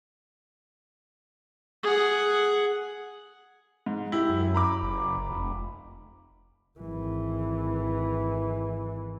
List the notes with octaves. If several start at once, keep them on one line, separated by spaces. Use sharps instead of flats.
G#4 F#5
G#2
E4 G4
F#2
A#5 B5 D6
F#1
F1
G#1 E3